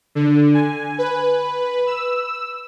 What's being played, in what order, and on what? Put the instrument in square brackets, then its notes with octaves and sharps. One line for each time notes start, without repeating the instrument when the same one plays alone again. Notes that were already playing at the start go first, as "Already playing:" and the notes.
[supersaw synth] D3
G#5
B4
E6